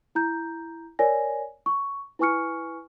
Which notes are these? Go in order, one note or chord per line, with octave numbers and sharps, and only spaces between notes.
E4 A#5 G6
A#4 C#5 D5 G#5 A#6
C#6
E4 B4 G#5 C#6 F6 C#7